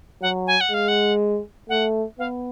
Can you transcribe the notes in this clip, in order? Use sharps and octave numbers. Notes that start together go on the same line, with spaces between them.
F#3 F#5
G#5
F#5
G#3 F5
F#5
A3 F#5
B3 F5